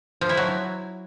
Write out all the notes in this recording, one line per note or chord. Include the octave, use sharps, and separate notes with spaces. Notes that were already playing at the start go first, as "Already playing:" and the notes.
F3
E4
F#3